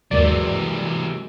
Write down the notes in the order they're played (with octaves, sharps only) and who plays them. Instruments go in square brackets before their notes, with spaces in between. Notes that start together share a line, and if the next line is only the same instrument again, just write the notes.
[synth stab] G1 D#2 D5 [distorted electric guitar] C3 E3 [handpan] F#3 G#3 A#4